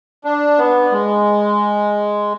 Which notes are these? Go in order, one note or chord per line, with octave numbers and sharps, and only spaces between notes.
D4
B3
G#3